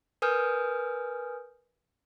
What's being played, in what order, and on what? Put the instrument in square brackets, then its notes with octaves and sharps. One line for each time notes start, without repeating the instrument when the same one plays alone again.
[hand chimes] A#4 B4 G#5 D#6 F6 G6